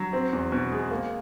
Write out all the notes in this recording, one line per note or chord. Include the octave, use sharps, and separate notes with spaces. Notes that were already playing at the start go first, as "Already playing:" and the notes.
Already playing: F#3
C4
E2
B2
G#3
A#3